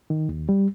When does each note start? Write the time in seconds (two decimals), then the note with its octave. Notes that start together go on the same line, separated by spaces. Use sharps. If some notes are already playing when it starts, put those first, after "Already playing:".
0.10 D#3
0.29 D#2
0.49 G3